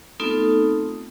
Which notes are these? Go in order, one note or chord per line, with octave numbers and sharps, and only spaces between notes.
A3 B3 C4 D#4 F4 A4